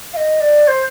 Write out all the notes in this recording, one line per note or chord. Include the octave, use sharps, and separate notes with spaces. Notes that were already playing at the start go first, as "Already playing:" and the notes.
F5
D#5
D5
C5